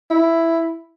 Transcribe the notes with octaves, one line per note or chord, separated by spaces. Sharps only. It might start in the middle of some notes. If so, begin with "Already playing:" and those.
E4